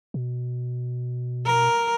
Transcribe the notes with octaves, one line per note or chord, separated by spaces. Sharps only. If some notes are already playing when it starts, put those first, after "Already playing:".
B2
A#4